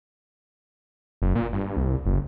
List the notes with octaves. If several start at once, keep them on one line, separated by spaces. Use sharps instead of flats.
F#1
A#2
G2
C2
F#1